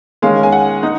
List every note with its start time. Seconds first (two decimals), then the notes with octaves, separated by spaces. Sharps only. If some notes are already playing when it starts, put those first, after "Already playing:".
0.22 D#3 G#3 C#4 F5
0.43 G#5
0.52 F#5
0.83 D#4